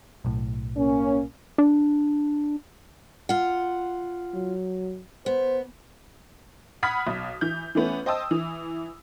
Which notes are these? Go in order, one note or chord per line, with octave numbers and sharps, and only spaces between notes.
B1 A2
A#3 C#4
D4
F4 F#5
F#3
B3 C5
F#5 B5 D#6 F6 G#6 B6
B1
E3 G6
E3 A3 B3 C#4
C5 D#5 G5 A5 D#6 E6
E3